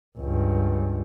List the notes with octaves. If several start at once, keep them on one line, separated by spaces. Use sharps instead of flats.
C#2 G2